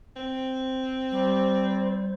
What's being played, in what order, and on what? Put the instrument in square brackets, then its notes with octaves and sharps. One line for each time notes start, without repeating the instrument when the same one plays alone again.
[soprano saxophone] C4
[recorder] G3 [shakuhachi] C5